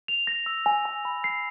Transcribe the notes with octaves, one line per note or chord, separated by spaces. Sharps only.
F7
A#6
E6
G#5
G#5
B5
C7